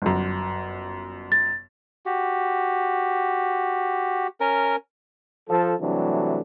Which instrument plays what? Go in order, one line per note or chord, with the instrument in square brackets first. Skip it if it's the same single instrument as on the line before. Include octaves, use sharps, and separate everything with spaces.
[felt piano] G1 F#2
[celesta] A6
[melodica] F#4 G4
C#4 A#4
[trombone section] F3 A4
C3 E3 F#3 G3 A3 D4